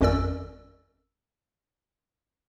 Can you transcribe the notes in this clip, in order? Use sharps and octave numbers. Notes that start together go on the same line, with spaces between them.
G#1 F2 C#4 A#4 D5 E6